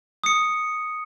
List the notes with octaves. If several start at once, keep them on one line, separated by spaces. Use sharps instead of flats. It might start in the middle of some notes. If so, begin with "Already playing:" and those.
D#6 C#7